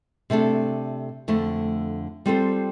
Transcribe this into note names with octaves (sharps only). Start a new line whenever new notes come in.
C3 A3 D4 A4
F2 D3 A3
G3 C4 F4 A4 C5